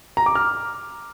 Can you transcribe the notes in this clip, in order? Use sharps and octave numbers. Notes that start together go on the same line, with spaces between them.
A#5
D6
F6